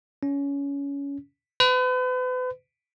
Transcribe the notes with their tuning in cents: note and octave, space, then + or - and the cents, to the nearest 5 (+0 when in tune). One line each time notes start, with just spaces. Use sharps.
C#4 +20
B4 +40